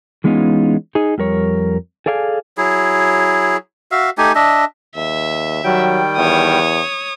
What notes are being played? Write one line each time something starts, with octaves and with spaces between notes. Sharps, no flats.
E3 G#3 B3 C#4 D#4 F4
D#4 G#4
F2 G3 A#4 C#5
G#4 A4 D5 F5 G5 G#5
F#3 E4 G#4
F#4 E5 F5
A3 D#4 G4 G#5
D4 D#5 E5
D#2 E5
D#3 F#3 G3 G5
E2 C#5 D#6